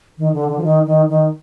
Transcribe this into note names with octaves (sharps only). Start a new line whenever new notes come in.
D#3
D3
D3
F3
D#3
D#3
D#3